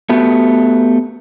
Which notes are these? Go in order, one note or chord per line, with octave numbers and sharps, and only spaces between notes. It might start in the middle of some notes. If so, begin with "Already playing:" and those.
A3 B3 F#4 G4